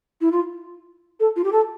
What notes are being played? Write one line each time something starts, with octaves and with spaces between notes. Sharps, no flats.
E4
F4
A4
F4
G4
A4